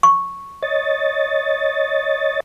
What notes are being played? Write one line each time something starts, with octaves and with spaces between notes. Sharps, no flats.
C#6
C#5 D#5 A6